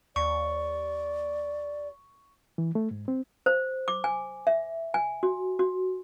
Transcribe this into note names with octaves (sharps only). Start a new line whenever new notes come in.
D#2 D5 C#6
E3
A3
G#2
C4
C5
D6
G#5
E5
G#5
F#4
F#4